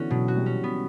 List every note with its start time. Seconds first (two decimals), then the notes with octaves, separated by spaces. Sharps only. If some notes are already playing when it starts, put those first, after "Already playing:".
Already playing: D3 E3 B3 C#4 F#4
0.10 B2 F#3
0.28 F#4
0.37 G3
0.46 C#4
0.63 B3